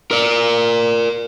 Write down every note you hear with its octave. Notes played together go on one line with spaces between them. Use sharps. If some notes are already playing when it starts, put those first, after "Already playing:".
A#4 D5